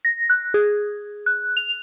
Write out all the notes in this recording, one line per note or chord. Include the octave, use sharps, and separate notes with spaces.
A#6
F#6
G#4
F#6
F7